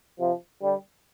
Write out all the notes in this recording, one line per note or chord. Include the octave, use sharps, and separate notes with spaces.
C3 F3
D3 G3